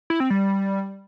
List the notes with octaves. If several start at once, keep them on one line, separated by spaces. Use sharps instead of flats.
E4
C4
G3